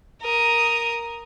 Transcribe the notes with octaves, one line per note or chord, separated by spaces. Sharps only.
A#4 D#6